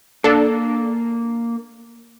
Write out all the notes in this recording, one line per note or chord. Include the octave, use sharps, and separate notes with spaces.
A#3 D4 A4